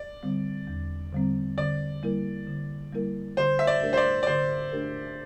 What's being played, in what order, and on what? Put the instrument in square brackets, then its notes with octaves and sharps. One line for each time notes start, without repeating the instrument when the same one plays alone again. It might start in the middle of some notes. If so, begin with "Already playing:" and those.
Already playing: [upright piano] D5
[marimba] D3 G3 C4
E2
D3 G3 C4
[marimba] D3 [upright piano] D5
[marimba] G3 A#3 E4 A#4
D3
G3 A#3 E4 A#4
[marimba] D3 [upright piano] C5
[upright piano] E5
D5
[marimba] A3 D4 G4 A#4
[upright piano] C5
D5
D5
[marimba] D3 [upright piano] C5
[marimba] A3 D4 G4 A#4